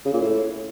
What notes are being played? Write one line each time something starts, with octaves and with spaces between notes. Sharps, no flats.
C#3
A#2
A2